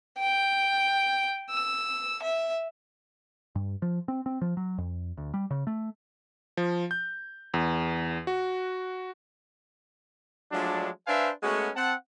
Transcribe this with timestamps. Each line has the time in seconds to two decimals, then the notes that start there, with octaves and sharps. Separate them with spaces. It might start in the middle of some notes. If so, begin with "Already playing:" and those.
0.19 G5
1.50 E6
2.23 E5
3.55 G2
3.82 F3
4.08 C4
4.26 C4
4.41 F3
4.57 F#3
4.78 F2
5.17 D2
5.34 G3
5.51 C#3
5.67 A3
6.57 F3
6.91 G6
7.54 E2
8.27 F#4
10.52 F3 F#3 G#3 A3 D4
11.07 D4 B4 C5 E5 F5 G#5
11.42 G#3 A3 B3 C#4 F#4
11.75 C4 F#5 A5